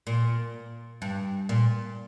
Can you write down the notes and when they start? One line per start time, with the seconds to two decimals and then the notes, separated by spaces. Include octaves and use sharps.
0.07 A#2
1.02 G2
1.49 A#2